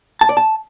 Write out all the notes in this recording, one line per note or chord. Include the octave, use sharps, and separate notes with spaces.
A5
D5
A5